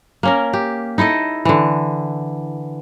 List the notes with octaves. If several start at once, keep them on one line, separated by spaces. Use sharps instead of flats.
A#3 C#4 A#4
G4
D#4 E4 A4 D#5
D3 E3